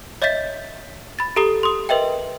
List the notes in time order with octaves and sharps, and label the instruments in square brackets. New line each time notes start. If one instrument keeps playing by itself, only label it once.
[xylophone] C#5 D#5 E5 G6 A6 B6
B5 A6
G4 A4 A#5 D#6 C7 G7
C6 D#6
A#4 B4 D#5 E5 G5